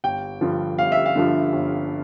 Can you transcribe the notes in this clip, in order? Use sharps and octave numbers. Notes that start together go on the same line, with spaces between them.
G1 G5
G2 D3 F3
G1 F5
E5
F5
G2 D3 F3
G1